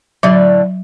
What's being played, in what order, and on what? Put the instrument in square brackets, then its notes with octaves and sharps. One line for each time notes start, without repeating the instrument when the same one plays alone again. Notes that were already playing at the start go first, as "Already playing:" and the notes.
[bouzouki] A2 D3 [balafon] F#3 E5